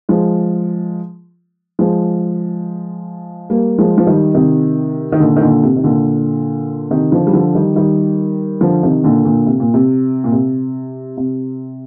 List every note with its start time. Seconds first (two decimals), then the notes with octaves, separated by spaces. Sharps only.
0.09 F3 G#3
1.79 F3 G#3
3.50 G3 A#3
3.78 F3 G#3
3.98 F3
4.07 D#3 G3
4.35 C3 D#3
5.12 D#3
5.20 A#2 D3
5.36 D#3
5.41 A#2 D3
5.63 C3
5.76 D#3
5.84 A#2 D3
6.90 C3 D#3
7.12 D3 F3
7.27 G3
7.33 D3 F3
7.55 D#3 G3
7.76 D#3 G3
8.61 D3 F3
8.83 C3 D#3
9.04 A#2 D3
9.25 A#2 D3
9.46 C3
9.60 A#2
9.74 C3
10.24 A#2
10.32 C3
11.17 C3